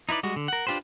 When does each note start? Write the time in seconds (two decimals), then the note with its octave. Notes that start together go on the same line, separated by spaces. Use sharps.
0.09 D#4 E4 B4 D5
0.23 G3 G#3 F#4
0.36 D3
0.48 A#4 F#5
0.67 D4 F4 G4 B4 C5